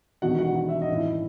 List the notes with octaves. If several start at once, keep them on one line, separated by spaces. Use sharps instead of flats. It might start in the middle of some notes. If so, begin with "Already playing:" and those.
E1 E2 D#3 G3 F#4 F#5
F#4 F#5
F#5
E5
D#5
A1 G2 D#3
E4 E5